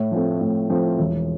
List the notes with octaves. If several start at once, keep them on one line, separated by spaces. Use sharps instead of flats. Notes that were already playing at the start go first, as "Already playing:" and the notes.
Already playing: A2
F3 A3 C4
A2
F3 A3 C4
E1